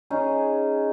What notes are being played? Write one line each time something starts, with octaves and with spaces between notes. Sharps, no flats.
C#4 D#4 G#4